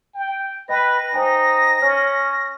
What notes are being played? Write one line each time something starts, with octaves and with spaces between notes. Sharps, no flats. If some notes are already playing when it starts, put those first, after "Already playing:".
G5
B4 D#5 G5 A#6
D#4 C5 G5 G#5
C#4 C#5 F6